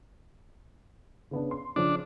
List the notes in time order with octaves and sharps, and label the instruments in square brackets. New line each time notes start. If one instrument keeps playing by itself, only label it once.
[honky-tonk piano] C#3 B3 D4
C6
[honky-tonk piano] C#3 F3 [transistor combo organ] D4